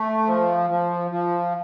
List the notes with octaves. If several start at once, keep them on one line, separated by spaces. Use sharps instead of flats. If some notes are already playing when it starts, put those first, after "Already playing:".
Already playing: A3
F3
F3
F3